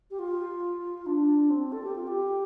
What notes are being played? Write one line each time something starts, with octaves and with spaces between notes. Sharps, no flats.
G4
F4
D4
C4
A4
G4
F4
G4